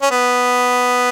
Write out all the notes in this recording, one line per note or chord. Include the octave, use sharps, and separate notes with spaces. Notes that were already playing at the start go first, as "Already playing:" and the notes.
C#4
B3